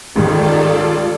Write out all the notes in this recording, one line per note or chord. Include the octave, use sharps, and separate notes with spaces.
C#2 G#2 D#3 G3 F4 A4 D5